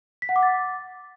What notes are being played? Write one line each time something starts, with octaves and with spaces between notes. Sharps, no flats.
B6
F#5
D6
A6